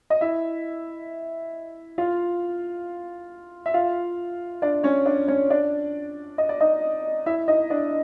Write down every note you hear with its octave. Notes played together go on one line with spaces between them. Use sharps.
D#5
E4 E5
F4 F5
E5
F4 F5
D4 D5
C#4 C#5
D4 D5
C#4 C#5
D4 D5
D#5
D5
D#4 D#5
E4 E5
D#4 D#5
D4 D5